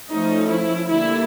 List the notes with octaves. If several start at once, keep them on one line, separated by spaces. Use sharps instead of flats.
F3 A3 C#4 D#4
E4
D3 G3 A#3 E4